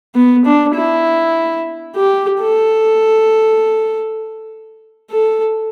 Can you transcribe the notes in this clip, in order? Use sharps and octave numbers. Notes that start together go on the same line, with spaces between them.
B3
D4
E4
G4
A4
A4